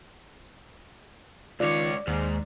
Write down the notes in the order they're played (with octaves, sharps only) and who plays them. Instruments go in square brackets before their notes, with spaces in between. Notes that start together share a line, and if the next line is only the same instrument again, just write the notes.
[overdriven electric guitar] C#2 C#5 [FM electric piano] D#3 F4 [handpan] D5
[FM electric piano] D#2 [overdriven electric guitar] G#2